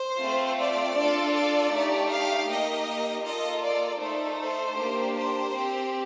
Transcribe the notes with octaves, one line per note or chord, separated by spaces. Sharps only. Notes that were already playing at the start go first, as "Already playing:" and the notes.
Already playing: C5
A3 C4 F4
D5
D4 F4 A4
D5
A3 D#4 G4
F5
A#3 D#4 G4 D#5
A#3 F4 A4 D#5
D5
A3 D#4 A4 C5
C5
A#3 D4 G4
C5
C4 G4